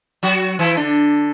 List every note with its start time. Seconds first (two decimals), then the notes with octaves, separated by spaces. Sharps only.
0.23 F#3 F#4
0.59 E3 E4
0.77 D3 D4